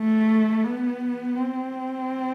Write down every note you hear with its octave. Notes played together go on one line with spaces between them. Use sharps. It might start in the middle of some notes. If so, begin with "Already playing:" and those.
Already playing: A3
B3
C4